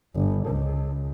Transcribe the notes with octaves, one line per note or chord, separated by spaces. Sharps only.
G1
C#2